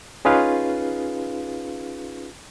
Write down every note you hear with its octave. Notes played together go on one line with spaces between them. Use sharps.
C#4 D#4 F4 G#4 B4 F5